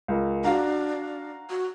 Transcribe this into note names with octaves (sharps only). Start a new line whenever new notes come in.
C#2 A#4
D4 F#4 F5 A#5
F#4